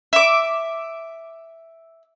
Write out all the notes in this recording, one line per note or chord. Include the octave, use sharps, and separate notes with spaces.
E5 D6